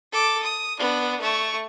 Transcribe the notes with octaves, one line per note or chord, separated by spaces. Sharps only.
A4 D6
D#6
B3 D4
A3 C#6